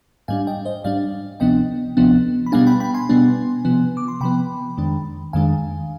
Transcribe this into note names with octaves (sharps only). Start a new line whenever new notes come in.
G#2 G3 D4 F5 G#5
D#5 G5
C5 D#5
G#2 G3 D4 D5 F5
D2 C3 F3 B3 D4 D#5 G5
D2 C3 F3 B3 D4
B5
B2 G3 B3 D4 F5 G#5
G5 B5
G5 B5
G#5 C6
B2 G3 B3 D4
C3 F3 B3
D6
C6
C3 F3 B3 G5 B5
F2 D#3 G#3 D4
F2 D#3 G#3 D4 F5 G#5